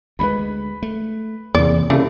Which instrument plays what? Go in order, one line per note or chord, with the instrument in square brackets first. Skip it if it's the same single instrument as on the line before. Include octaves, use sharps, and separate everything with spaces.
[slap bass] D2 G3 G#3 [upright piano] B4 B5
[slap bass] A3
[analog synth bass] E2 [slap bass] C3 A#3 [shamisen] D5
[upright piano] C2 [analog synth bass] C#3 [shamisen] E3 A3 D4